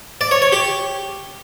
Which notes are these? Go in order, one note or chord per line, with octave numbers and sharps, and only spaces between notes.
D5
C#5
C#5
G4